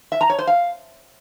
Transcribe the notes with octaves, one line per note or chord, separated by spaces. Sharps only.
E5
A#5
C#5
C5
F5